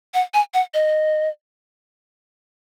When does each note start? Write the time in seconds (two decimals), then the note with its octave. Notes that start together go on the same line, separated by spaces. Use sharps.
0.14 F#5
0.34 G#5
0.54 F#5
0.74 D#5